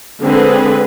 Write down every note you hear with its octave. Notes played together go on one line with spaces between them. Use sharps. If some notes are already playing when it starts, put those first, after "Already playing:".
D3 G#3 C4 G#4 B4